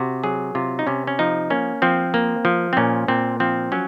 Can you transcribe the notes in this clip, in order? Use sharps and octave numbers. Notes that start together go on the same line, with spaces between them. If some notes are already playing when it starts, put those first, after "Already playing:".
Already playing: C3 F#4
F#3 G#4
C3 F4
D#4
C3 C#4
C#4
F3 D#4
A#3 C#4
F3 C4
A#3
F3
C4
A#2 C#4
A#2 C4
F3 C4
F#3 C#4